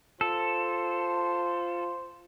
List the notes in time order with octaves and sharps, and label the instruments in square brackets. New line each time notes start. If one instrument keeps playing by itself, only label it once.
[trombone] F4 [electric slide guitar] A4 [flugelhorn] C5